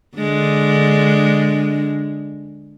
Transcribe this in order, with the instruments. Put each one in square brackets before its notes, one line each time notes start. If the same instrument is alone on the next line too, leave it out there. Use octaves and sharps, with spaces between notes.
[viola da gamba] D3 G#3 D4